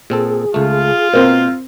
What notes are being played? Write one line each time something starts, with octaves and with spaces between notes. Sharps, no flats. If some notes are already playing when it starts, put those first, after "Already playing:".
A#2 C4 G#4 A4
C#2 A3 F4
B2 A#3 C4 A#4 C5